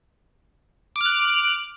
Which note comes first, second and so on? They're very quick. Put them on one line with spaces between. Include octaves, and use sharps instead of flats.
D6 F6 F#6